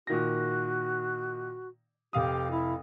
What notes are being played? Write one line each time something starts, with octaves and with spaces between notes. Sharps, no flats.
A#2 D#3 F#4 A#6
F1 G4 F5 D#6
E4